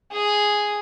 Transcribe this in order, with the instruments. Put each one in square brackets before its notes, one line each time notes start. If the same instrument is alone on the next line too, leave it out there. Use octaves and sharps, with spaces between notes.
[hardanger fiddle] G#4